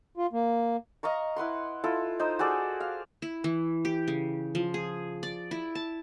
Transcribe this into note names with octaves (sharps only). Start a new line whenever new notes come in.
F4
A#3
D#5 F5 A#5 C#6
E4 B4 F#5 C6
E4 F4 A4
D#4 C5 D#6
F#4 G#4 A4 D5
F5
E4
E3
G4
C#3
F3
G#4
D5
E4
A5